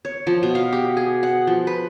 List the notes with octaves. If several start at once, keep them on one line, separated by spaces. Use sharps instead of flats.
C#5
F3
B2
F5
G4
G#4
F#5
F3
B4